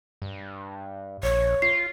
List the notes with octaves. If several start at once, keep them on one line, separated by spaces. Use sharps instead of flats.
G2
A#1 C#5
F4 C7